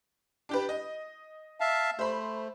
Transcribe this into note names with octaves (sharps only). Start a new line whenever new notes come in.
D4 G4 B4
D#5
E5 F5 A5
A3 C5 B5